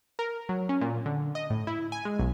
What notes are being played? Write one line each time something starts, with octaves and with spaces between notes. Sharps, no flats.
A#4
F#3
C#4
A#2
D3
D#5
A2
E4
G#5
G#3
B1